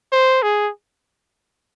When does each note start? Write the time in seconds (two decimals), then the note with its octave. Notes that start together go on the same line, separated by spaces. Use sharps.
0.12 C5
0.42 G#4